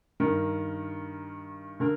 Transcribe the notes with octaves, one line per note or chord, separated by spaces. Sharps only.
D#3 A#4
G2
D3 A#4